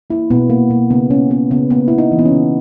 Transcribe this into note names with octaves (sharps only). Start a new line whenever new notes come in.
A#3 E4
B2 B3
A#3
B2 A#3
C#3 B3
A#3 C#4
A#3 B3
C#3 B3
A#3 B3
C#3 E4
D#4
E3
B3
C#4
C#3